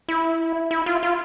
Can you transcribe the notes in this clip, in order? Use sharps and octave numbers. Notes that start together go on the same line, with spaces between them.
E4
E4
F4
F4